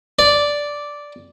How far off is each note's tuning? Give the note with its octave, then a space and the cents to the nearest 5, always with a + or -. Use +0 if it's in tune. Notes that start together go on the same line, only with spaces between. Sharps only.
D5 -5